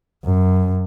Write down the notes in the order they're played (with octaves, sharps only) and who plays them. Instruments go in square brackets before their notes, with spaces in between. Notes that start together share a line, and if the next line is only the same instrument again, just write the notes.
[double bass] F#2